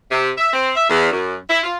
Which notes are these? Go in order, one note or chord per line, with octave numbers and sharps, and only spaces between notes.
C3
E5
C4
E5
E2
F#2
E4
F4